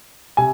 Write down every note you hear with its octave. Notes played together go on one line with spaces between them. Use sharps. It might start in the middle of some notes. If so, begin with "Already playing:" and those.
C3 G#5